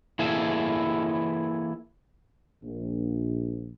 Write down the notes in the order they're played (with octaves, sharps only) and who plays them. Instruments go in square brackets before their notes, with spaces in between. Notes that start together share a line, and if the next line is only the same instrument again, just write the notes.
[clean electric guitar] E3 A#3 E4 G#4 A4
[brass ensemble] A#1